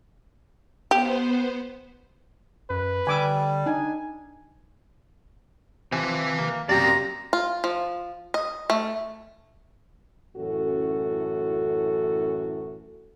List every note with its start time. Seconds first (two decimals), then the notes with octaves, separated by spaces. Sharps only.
0.91 B3 G4 C5
2.70 F#2 B4
3.07 D3 G3 G#5 D6 E6
3.66 D4 D#4 G#5
5.92 C3 F3 B4 G#5
6.38 A#3
6.69 F#2 A#3 C4 G4 D5 A#5
7.33 F4
7.64 F3
8.34 D#5
8.70 A3
10.36 F#2 A2 E3 C#4 F#4 A4